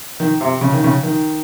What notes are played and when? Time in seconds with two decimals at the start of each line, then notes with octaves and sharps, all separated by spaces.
0.20 D#3
0.41 C3
0.61 C#3
0.73 D#3
0.84 C#3
1.03 D#3